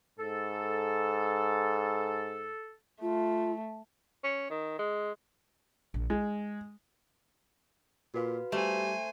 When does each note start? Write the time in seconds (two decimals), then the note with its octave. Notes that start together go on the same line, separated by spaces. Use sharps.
0.19 G#2 A4
3.02 A3 F4
4.24 C#4
4.50 D#3
4.79 G#3
5.94 A#1
6.10 G#3 D#4
8.14 A#2 F#4 B4 F5
8.52 G3 A3 C5 G#5